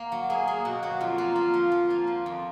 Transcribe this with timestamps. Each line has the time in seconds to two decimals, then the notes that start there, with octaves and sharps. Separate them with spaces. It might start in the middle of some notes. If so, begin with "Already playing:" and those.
Already playing: A#3
0.12 F#3
0.29 A#3 G#4
0.48 A#3
0.65 B2 F#4
0.83 F#3
1.00 F2 F4
1.18 A#3
1.36 A#3
1.54 F3
1.72 F3
1.90 A#3
2.07 F3
2.26 F2